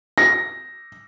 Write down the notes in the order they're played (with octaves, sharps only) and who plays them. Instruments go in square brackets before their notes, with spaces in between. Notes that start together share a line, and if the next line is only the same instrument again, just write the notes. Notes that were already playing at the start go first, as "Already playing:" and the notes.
[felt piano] A#6